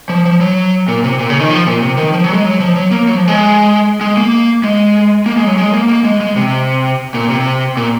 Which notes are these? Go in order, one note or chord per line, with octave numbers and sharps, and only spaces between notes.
F3
F3
F#3
A#2
C3
A#2
C#3
D#3
F3
A#2
C3
D#3
F3
F#3
G#3
F#3
F3
F#3
A#3
F#3
F3
G#3
G#3
A#3
G#3
A#3
G#3
F#3
G#3
A#3
A#3
G#3
G#3
C3
A#2
C3
A#2